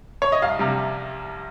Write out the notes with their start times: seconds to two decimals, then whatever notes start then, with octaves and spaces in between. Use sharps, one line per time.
0.22 C#5
0.32 D#5
0.42 C2 F5
0.59 C3 G3